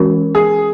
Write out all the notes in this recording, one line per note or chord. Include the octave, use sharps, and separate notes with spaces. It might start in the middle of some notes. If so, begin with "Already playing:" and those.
Already playing: E3 G#3 C#4 F#4 A#4
G#4